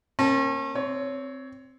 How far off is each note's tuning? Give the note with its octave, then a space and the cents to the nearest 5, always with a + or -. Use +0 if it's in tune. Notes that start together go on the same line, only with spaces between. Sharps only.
A#3 +0 C#4 -35 A5 +0
C4 +0 C#5 +20